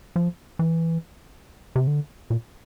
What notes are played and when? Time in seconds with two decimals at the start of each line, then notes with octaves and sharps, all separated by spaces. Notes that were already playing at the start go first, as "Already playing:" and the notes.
0.16 F3
0.59 E3
1.76 C3
1.87 D3
2.30 A#2